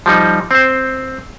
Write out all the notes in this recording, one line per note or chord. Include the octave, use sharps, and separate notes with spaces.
F3 G3 D#4
C4 C5